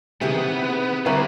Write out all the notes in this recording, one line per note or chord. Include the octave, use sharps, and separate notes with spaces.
C3 D#3 E3 B3 G#4
D3 G3 B3 C4 E4 B4 C#5 A#5